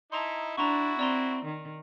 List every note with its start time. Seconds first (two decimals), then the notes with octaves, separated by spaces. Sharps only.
0.12 D#4 E4 A5 A#5 C6
0.57 D4 E4 F#4 A#5 C6 C#6
0.99 C4 D5 A#5 C6
1.45 D#3